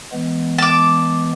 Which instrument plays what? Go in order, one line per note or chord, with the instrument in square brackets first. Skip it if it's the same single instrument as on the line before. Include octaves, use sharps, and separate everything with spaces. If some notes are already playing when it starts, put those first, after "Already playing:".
[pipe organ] E3 G#3 B3
[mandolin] A5 D6